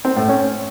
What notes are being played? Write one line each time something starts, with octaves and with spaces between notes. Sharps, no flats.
C4
A2
C#4